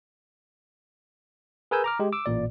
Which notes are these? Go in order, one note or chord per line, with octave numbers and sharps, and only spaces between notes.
G#4 A#4 B4 G#5 E6 G6
A#5 D6 F6
G#3 G4
D6 E6
A1 A#2 D5